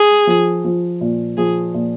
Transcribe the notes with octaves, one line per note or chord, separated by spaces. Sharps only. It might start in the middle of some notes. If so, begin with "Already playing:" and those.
Already playing: G#4
F3
F3
A#2
F3 G#4
A#2